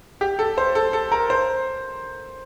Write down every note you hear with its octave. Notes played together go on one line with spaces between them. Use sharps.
G4
A4
C5
A4
A4
A#4
C5